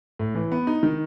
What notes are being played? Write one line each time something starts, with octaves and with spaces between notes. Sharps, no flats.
A2
E3
B3
D#4
D#3